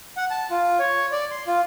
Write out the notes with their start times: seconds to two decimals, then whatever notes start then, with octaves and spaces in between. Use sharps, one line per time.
0.17 F#5
0.31 A5
0.51 F4
0.79 C#5
1.12 D5
1.31 C6
1.47 F4